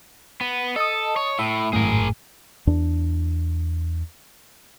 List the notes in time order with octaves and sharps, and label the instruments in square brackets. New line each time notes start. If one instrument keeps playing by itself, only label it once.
[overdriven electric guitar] B3
[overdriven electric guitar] A4 [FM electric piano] D#5 A5 D#6
[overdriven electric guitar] C#5
[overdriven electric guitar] A2 [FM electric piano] E5
[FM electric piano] G#1 F#2 A2 [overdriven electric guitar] G#4 A#4
[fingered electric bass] E2 D4